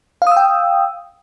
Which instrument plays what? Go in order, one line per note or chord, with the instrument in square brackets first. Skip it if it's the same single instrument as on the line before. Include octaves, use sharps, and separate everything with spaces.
[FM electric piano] F5
D#6
E6
G5